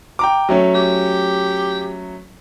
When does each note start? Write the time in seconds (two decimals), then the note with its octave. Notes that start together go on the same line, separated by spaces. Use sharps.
0.19 G5 A#5 D6
0.49 F#3 A3 C#4
0.75 G4